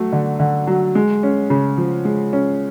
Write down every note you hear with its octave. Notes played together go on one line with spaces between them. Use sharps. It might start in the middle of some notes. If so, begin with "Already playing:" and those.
Already playing: F#3 A3
D3
D3
F#3
G#3
C#4
C#3
F3
G#3
C#4